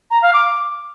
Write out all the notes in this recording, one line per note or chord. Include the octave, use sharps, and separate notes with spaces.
A#5
F5
D6